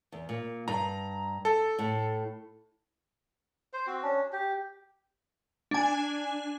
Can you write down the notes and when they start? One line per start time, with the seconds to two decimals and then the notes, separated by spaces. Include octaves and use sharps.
0.12 E2
0.29 A#2
0.68 G2 A#5
1.45 A4
1.79 A2
3.73 C5
3.87 C4 F#4
4.03 C#4 D4
4.33 G4
5.71 D4 G#5